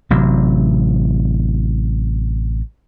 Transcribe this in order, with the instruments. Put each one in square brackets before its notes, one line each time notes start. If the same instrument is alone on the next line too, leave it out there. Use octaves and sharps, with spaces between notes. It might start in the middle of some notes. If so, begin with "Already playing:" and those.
[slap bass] A1 C3 F#3